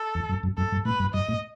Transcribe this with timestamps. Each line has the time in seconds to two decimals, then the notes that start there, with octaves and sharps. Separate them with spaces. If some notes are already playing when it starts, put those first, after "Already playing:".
Already playing: A4
0.15 E2
0.29 F#2
0.43 F#2
0.57 F#2 A4
0.72 G2
0.85 A2 B4
0.99 G2
1.14 G2 D#5
1.29 A2